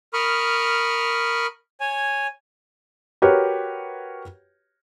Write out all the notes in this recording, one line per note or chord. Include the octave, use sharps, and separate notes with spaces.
A#4 B5 C#6 D#6 F6
C#5 G#5
F#4 G4 A#4 B4 C#5